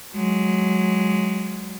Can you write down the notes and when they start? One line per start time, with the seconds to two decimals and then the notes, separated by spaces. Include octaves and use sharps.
0.15 F#3 G#3